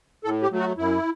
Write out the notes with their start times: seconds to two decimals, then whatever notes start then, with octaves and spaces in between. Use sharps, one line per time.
0.24 A2 A4
0.43 G4
0.51 F#3 A3
0.60 F#4
0.77 F#2 E4